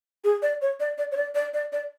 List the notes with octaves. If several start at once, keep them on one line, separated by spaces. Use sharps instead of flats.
G#4
D5
C#5
D5
D5
C#5
D5
D5
D5
D5